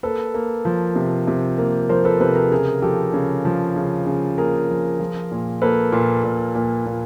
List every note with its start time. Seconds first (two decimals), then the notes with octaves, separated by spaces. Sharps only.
0.03 A#3 A4 B4
0.34 A#3
0.65 F3
0.96 C3
1.27 C3
1.58 A#3
1.89 F3 A#4 C5
2.05 A4 B4
2.20 C3 A4 B4
2.36 G#4 A#4
2.51 C#3 G#4 A#4
2.82 F3 G4 A4
3.14 C#3
3.45 F3
3.76 C#3
4.06 C#3
4.38 A#3 G#4 A#4
4.69 F3
5.00 F3
5.31 A#2
5.62 A#3 A4 B4
5.92 A#2
6.24 A#2
6.55 A#2
6.86 A#2